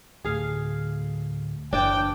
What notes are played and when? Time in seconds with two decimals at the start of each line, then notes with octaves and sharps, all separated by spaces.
0.24 D2 A2 G#4 F5
1.73 F#1 E3 D4 G5